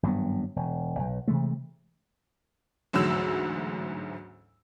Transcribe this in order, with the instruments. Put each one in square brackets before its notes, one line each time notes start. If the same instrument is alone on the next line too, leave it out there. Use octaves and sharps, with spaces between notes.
[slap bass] G#1 G2 F#3 B3
E1
B1
C3 E3 G#3 A3
[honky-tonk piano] A1 D2 G#2 F#3 E6